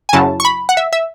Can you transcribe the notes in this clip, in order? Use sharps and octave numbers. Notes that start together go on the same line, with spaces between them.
G#5
F#2 C#3 F#3 C#4 E4 A5
C#6
B5
F#5
E5
E5